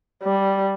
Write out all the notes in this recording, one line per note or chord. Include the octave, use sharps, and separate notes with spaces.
G3